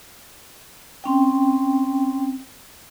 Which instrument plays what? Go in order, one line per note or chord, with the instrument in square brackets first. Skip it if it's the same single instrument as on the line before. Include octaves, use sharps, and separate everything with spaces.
[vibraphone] C4 C#4 G5